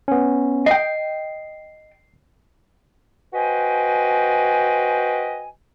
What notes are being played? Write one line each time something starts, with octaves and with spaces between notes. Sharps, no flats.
B3 C#4
D#5 G5 C7
F#4 B4 C5 D#5 G5 G#5